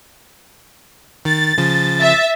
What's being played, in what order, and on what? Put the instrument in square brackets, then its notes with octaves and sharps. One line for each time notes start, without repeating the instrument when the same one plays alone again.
[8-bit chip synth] D#3 [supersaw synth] A6
[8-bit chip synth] C#3 F3
[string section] E5